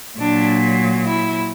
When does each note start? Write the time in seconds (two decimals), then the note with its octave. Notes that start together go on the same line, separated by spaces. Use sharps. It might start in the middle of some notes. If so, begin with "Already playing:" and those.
0.19 A#2 F#3 D4
1.05 E4